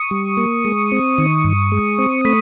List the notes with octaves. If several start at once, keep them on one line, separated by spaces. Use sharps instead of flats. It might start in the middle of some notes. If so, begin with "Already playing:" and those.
Already playing: C#6 D#6
G3
A#3
G#3
C4
D#3
G2
G#3
C4
A3 B5 C#6